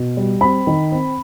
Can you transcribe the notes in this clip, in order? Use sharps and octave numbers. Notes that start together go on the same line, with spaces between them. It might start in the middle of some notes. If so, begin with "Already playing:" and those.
Already playing: B2
G3
C4 B5
D#3
C4